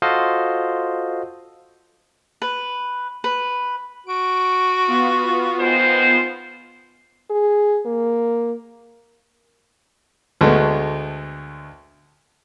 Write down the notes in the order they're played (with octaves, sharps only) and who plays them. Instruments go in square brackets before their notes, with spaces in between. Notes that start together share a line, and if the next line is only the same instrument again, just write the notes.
[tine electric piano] F4 F#4 A4 C5 D#5 F5
[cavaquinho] B4
B4
[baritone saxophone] F#4 [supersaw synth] D7
[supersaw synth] B3 F4
[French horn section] D#3 G#3 C5
[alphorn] G#4
A#3
[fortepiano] D2 G#3 A3 B3